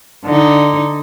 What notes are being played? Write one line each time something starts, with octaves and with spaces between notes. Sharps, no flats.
D3 D#4